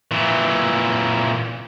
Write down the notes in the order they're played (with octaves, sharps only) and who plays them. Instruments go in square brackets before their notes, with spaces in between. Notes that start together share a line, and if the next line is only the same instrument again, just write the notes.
[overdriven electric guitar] A#2 E3